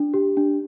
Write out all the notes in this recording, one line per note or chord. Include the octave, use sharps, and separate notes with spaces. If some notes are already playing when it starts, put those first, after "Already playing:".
Already playing: D4
G4
D4